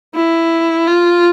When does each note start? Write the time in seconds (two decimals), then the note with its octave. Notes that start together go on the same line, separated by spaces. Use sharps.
0.15 E4
0.87 F4